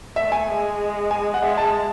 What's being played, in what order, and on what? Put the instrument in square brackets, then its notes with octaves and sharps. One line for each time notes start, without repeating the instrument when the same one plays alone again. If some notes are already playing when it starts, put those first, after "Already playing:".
[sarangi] A3 [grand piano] E5
[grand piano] G#5
[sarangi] G#3
[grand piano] G#5
F#5
[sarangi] G#3 [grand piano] E5
[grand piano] A5